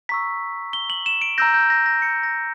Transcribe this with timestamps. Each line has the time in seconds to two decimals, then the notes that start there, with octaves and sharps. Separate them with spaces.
0.09 A#5 C#6 E6 B6
0.73 G7
0.90 F#7
1.06 E7
1.22 D7
1.38 A#5 E6 G6 A#6
1.54 G6
1.70 A#6
1.86 A#6
2.02 C#7
2.23 A#6